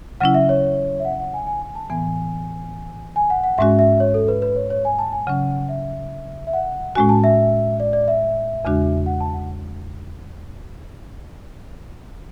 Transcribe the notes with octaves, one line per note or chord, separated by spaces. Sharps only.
C#3 F#3 C#4 E4 F#5
E5
C#5
E5
F#5
F#5
G#5
G#5
G#5
A5
A2 E3 B3 G#5
G#5
F#5
F#5
G#2 G#3 C#4 F#4 E5
E5
C#5
A4
B4
B4
C#5
C#5
G#5
A5
G#5
C#3 F#3 C#4 F#5
E5
E5
F#5
A2 G#3 C#4 F#4 G#5
A5
E5
D5
D5
E5
E2 C#3 G#3 D4 F#4
F#5
A5
F#5